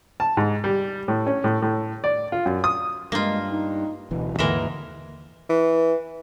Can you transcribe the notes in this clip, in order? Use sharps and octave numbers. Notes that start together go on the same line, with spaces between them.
A5
G#2
G3
A2
C#4
A2
A2
D5
F4
F#2
D#6
G2 G#3 A#3 F4
D#4
D1 A1 B2 E3
D#2 G#2 D3 E3 G#3 A#3 A#4
E3